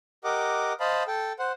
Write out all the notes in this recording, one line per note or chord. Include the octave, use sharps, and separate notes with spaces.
G4 A#4 D#5 F#5 D6
C5 D#5 F5 A5 B5
A4 G5
C5 F#5